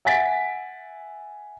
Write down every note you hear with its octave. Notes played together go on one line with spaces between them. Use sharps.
E5 F#5 G#5 A6 B6 D7